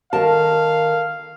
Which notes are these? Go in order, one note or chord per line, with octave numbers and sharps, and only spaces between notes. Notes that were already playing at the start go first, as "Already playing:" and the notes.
D#3 A#4 F5 A5